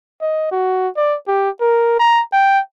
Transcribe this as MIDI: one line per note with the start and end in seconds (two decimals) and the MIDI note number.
0.22 0.50 75
0.52 0.88 66
0.97 1.16 74
1.28 1.49 67
1.61 1.99 70
2.00 2.22 82
2.33 2.60 79